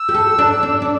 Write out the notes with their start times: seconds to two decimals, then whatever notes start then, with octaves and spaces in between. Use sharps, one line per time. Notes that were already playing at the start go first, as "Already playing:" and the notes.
Already playing: E6
0.09 G4
0.14 A4
0.39 D4
0.63 D4
0.82 D4